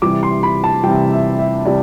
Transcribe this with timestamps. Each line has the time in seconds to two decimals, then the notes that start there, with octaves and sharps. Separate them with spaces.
0.02 C3 E3 G3 D6
0.23 C6
0.43 B5
0.64 A5
0.84 C3 E3 G3 G5
1.12 E5
1.39 E5
1.65 C3 E3 G3 D5